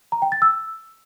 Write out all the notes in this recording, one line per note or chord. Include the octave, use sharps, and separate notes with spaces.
A#5
G5
A6
E6